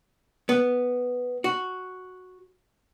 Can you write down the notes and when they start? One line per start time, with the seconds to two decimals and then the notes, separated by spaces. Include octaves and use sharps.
0.49 B3
1.44 F#4